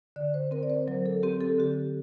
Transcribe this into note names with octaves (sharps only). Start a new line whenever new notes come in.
D3 D5
C5
C4 A#4
D5
C5
F#3 A#4
A4
C4 G4
A4
D3 G4